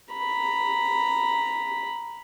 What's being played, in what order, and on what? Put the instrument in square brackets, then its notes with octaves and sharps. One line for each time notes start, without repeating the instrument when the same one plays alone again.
[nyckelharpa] A#5 B5